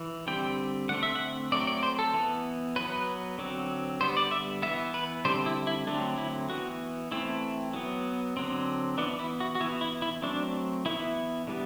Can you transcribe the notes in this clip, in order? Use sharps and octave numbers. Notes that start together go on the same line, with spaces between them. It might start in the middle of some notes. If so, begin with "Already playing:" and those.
Already playing: E3
D3 G3 C4 G5
D3 A3 C4 F#5
E5
F#5
F#3 A3 C4 D5
D5
C5
A4
E3 B3
F#3 B3 B4
D3 F#3 C4
D3 G3 B3 C5
D5
E5
E3 B3 E5
B4
D3 G3 C4 C5
E4
E4
D3 F#3 A3 C4 D4
E4
E3 B3 F#4
E3 A3 C4 E4
F#3 B3
D3 F#3 C4
E3 B3 D4
E4
F#4
F#4
E3 B3 E4
E4
E4
F#3 A3 C4 D4
E3 B3 E4
D3 G3 B3